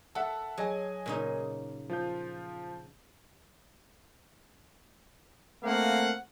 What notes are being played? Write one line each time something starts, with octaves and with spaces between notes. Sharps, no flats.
A4 E5 F#5 A5
F#3 G#4 D#5 G#5
A#2 C#3 D#4
F3 F4 G6
A3 A#3 C4 F5 F#5